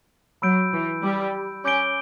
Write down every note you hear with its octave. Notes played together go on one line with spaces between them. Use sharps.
F#3 B5 E6 G6 D7
E3
G3
C#4 D6 G6 D7 G7